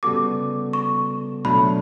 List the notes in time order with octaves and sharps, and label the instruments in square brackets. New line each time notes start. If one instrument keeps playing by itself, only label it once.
[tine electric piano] C#3 G3 B3 F#4 A4 [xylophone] D6
[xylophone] C#6
[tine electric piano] B2 F#3 A3 D4 [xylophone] B5